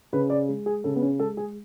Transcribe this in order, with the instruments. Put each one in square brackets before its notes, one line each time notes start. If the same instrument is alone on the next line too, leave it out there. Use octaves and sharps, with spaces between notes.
[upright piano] C#3 B4
D5
G#3
G#4
C#3 A4
B3
C#4
G#3 A4
G#4